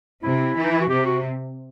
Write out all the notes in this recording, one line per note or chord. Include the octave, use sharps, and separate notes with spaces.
C3 E4
E3
D#4
E4
F#4
C3 G4
F#4